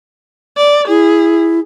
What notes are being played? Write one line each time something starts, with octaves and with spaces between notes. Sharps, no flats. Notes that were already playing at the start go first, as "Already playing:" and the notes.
D5
E4 G#4